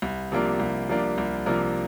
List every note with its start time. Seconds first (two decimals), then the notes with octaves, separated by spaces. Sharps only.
0.02 C2
0.32 C3 F3 A#3 D4
0.60 C2
0.89 C3 F3 A#3 D4
1.18 C2
1.46 C3 F3 A#3 D4